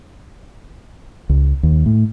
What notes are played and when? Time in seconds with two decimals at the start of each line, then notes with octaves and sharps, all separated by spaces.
1.29 C#2
1.63 D#2
1.86 A2